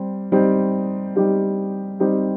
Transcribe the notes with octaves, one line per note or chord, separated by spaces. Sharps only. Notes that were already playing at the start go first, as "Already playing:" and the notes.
Already playing: G3 C4
G3 C4 D#4 G4
G3 C4 D#4 G4
G3 C4 D#4 G4